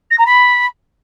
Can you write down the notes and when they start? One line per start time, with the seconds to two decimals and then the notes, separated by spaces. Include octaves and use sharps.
0.10 A#6
0.18 A#5
0.26 B5